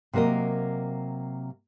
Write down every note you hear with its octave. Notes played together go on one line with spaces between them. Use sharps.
C3 F#3 A#3 A#4 D#5